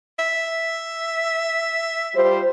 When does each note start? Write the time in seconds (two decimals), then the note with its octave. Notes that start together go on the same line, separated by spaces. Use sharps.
0.19 E5
2.15 G3 F4 C5